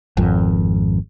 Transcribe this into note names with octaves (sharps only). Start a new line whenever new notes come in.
G#1 F2